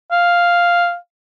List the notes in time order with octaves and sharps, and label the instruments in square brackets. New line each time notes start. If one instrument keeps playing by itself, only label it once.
[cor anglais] F5